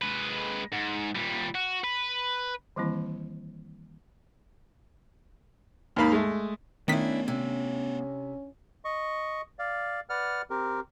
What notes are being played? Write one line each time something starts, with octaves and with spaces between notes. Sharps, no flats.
G#3 B4
G#2
A#2 G3
F#4
B4
D#3 E3 G3 A#3 C4 E4
D#2 G#2 D#3 A#3 F5 B5
G#3 A3
D#3 A3 B3 C#4 D4 E4 B6
C3 C#4
D#5 C#6
D5 F5
B4 D5 F#5 F6
C4 G4 A#4